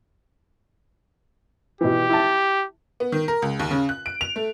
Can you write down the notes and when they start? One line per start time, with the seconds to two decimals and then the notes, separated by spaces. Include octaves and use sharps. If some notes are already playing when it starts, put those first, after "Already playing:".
1.81 B2 E3 G4
2.10 E4 A5
3.00 B3
3.12 D#3
3.28 A#4
3.42 C#2
3.59 D#2
3.71 C#3
3.89 F#6
4.06 D7
4.21 F7
4.36 A3